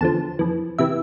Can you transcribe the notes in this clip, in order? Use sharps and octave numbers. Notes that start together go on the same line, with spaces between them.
E2 D3 F3 A5
F2 E3
C3 E3 E5